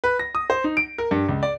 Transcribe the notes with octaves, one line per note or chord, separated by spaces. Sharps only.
B4
A#6
D#6
C5
D#4
D7
A#4
G2
C#2
D5